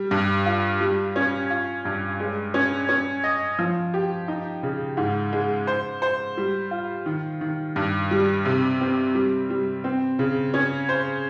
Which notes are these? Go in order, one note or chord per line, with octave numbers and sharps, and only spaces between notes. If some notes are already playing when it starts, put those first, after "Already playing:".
Already playing: G3
G2
F4
G3
C#4
F4
G2
G#3
C#4
C#4
D#5
F3
G4
D#4
C#3
G#2
G#3
C5
C5
G3
F4
D#3
D#3
G2
G3
C3
C4
G3
G3
C4
C#3
C#4
C5